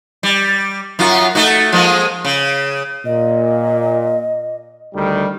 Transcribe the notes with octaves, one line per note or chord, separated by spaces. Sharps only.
G3
F#2 F4 F#4
A3 D#4 F#4
F3 G#3 A#3
C#3
A#2 D#5
D2 D#3 G3